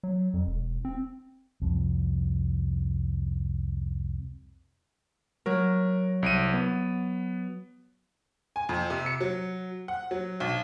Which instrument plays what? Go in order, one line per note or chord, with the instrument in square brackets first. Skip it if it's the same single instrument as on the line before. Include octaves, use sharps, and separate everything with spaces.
[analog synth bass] F#3
F2
E1
C4
[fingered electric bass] C2 F2
[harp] F#3 [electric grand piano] A#4
[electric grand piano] C2 D7 D#7
B3
[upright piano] G#5
F2
C3
C#7
F#3
F#5
F#3
B1